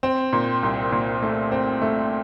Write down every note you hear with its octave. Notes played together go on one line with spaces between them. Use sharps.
C4
A#2
C2
A#2
A3
C4
A3